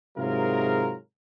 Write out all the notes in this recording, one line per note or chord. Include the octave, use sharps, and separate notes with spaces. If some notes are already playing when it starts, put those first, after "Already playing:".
G#2 C3 F#3 F4 G#4 A#4